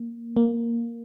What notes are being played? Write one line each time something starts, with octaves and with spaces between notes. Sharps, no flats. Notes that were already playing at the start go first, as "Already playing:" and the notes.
Already playing: A#3
A#3